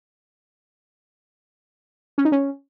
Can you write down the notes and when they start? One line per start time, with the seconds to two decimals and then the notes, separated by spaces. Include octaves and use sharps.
2.18 C#4
2.25 D#4
2.32 C#4